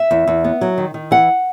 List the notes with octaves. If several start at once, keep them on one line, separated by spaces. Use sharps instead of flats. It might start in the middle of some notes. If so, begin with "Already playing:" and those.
Already playing: E5
E2
E2
B3
F#3
D#3
D#3
E3 F#5